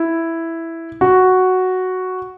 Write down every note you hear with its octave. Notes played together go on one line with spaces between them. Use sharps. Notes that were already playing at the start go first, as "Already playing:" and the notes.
Already playing: E4
F#4